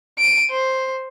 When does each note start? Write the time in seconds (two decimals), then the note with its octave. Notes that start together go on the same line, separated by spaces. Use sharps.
0.19 D7 D#7
0.50 C5